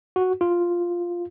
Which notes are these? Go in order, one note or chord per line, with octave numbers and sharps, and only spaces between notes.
F#4
F4